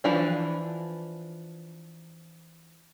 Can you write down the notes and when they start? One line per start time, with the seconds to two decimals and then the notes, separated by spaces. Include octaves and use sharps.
0.04 E3 F3 D4